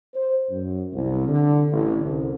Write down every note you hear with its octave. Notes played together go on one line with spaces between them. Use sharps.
C5
F#2
C2
D3
A1
C2